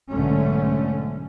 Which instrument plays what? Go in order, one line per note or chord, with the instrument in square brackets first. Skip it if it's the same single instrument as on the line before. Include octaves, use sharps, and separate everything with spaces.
[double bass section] B1 G#2 D3 A3 C#4